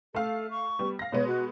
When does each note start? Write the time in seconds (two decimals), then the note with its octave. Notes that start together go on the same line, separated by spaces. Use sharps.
0.15 A3 A4 F5
0.51 C#6
0.79 G3 B3
0.99 F5 A#6
1.12 B2 G#3 B3 C#5
1.27 F#4